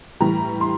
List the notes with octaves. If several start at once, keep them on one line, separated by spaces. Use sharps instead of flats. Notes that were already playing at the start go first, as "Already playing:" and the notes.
A2 E3 G3 A#5
C6